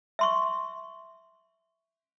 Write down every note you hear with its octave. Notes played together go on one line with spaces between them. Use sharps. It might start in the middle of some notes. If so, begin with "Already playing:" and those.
E5 C6 C#6